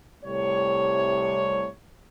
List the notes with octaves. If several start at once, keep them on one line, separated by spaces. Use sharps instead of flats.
C2 A2 C3 G3 C#5